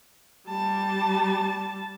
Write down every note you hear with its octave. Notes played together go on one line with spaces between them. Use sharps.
G3 A5